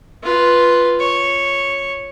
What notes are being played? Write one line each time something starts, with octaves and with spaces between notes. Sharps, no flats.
F4 B4
C#5